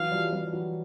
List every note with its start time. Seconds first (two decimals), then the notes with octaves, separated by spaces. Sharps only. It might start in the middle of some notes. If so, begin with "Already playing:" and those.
Already playing: E3 F#3 F5
0.12 F3 G3
0.32 F3 G3
0.53 E3 F#3